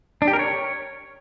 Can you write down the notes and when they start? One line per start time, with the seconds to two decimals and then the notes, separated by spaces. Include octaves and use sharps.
0.22 D4
0.28 G4
0.33 A#4
0.39 C#5